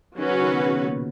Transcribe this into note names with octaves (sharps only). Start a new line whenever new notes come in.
D#3 F#3 C#4 F#4 B4
C#3
D#3
B2
C#3
B2
A#2